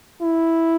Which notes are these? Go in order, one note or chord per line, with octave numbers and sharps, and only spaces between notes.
E4